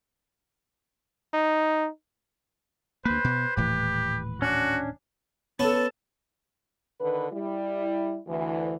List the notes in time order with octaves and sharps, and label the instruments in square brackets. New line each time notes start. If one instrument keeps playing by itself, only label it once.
[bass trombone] D#4
[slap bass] D2 A#3 [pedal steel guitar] B4 [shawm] C5
[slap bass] B2
[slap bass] D#1 A2 E3 [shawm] G4
[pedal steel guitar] C#4 D4 [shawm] F#4
[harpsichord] B3 C#4 B4 [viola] A4 A5
[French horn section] D3 D#3 B4
G3 E4
D2 E3